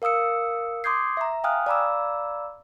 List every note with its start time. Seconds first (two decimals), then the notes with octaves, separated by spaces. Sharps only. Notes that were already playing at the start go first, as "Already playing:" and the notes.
0.02 A#4 F5 D#6 E6 C#7
0.84 C6 D6 D#6 G6 G#6 C7
1.17 E5 A#5
1.44 F5 G5 G#5 D#6 F6 F#6
1.66 D5 F5 A#5 B5 D6 E6